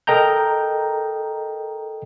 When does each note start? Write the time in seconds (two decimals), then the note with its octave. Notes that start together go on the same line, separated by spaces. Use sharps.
0.07 A4 A#4 D#5 G5 A#5 G6